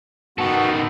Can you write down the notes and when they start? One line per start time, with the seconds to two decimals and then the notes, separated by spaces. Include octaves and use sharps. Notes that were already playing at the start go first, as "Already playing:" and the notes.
0.38 D#3 B3 F#4 A4